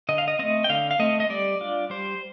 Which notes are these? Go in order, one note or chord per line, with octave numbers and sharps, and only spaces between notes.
D3 D#5
F5
D#5
A3 C4 D#5
G5
D3 F5
F5
A3 C4 D#5
D#5
G3 D5
D4 F4
G3 C5